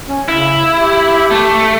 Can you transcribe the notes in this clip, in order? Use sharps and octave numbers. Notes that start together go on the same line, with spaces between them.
C#4
C#3 E4
G4
A3